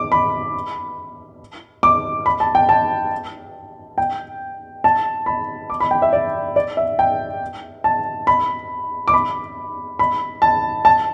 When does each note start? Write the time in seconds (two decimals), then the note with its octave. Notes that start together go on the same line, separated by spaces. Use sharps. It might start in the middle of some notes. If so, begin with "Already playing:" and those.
Already playing: D6
0.12 B5
1.83 D6
2.26 B5
2.40 A5
2.55 G5
2.69 A5
3.98 G5
4.84 A5
5.26 B5
5.70 D6
5.80 B5
5.91 G5
6.02 E5
6.13 D5
6.56 D5
6.77 E5
6.99 G5
7.84 A5
8.27 B5
9.08 D6
9.14 B5
9.99 B5
10.42 A5
10.85 A5